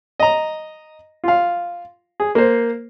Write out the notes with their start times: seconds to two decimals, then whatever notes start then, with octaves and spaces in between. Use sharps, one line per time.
0.20 D#5 A#5
1.24 F4 F5
2.20 G#4
2.35 A#3 C5